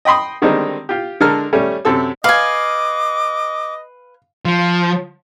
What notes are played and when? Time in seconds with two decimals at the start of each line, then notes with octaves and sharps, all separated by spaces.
0.05 D#5 G5 B5 C6 D#6
0.42 D3 D#3 G3 G#3 C4 D#4
0.89 F4 G4
1.20 D3 G#3 A4 A#4 A#5 F6
1.53 G3 A3 C#4
1.85 F#2 C3 A4 E6
2.24 B4 D#5 F5 G#5 D6
4.45 F3